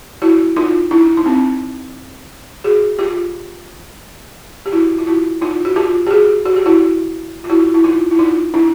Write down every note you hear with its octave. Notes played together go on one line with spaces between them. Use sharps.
E4 F#4
D#4 F4
D4 E4
D#4
C4 D4
F#4 G#4
F4 G4
G4
E4 F#4
F4
E4 F#4
D#4 F4
F#4
F4 G4
G4
F#4 G#4
F#4
G4
E4 F#4
F4
E4 F#4
E4
D#4 F4
E4
D#4 F4
D4 E4